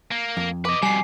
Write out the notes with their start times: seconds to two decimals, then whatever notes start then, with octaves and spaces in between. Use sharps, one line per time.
0.11 A#3
0.37 F2
0.65 B4 D#5 D6
0.83 F2 B2 G3 G#5 C7